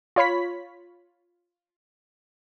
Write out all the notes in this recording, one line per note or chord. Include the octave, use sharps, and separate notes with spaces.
F4 C#5 B5 B6